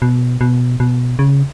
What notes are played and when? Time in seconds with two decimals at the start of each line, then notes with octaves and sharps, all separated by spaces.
0.02 B2
0.41 B2
0.80 B2
1.19 C#3